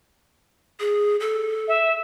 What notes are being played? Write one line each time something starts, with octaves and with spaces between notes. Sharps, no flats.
G#4
A4
E5